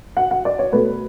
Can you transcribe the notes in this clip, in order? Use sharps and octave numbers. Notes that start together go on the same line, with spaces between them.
F#5
F#5
D5
C#5
B2 A3 B4